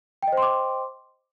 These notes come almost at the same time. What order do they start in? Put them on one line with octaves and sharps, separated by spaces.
G5 D#5 C5 C6 D6